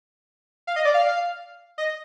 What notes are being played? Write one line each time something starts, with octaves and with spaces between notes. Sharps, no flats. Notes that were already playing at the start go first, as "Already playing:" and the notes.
F5
D#5
D5
F5
D#5